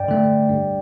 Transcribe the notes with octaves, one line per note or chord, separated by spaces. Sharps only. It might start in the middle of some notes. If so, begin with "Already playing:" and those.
Already playing: G2 D5 G5
D3 A3
G2